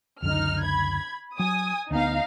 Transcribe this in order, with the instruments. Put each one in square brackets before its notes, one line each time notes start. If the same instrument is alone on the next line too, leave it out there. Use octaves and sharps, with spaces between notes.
[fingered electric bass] C#2 F#2 D3 [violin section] D#4 F6
[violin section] B5 G#6
[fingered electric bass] F#3 [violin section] G#5 D#6
[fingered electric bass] D2 B3 [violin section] D#4 F5